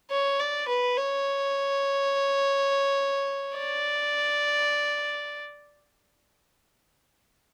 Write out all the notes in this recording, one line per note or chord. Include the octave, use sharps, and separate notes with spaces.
C#5
D5
B4
C#5
D5